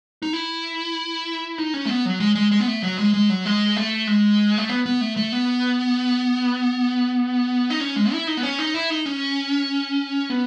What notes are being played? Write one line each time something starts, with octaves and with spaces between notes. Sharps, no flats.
D#4
E4
D#4
C#4
A3
B3
F#3
G#3
G#3
G#3
B3
A3
F#3
G#3
G#3
F#3
G#3
A3
G#3
A3
B3
B3
A3
A3
B3
D#4
C#4
G#3
E4
D#4
B3
C#4
D#4
E4
D#4
C#4
B3